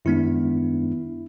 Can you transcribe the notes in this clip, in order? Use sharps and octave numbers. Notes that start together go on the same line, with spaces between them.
F#2 D#3 G#3 B3 D4 E4